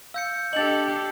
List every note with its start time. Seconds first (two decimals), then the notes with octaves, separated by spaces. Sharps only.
0.14 F5 E6 G6 C#7
0.53 D4 G4 A4 D#5 A6 F#7